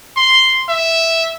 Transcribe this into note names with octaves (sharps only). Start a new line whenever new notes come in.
C6
E5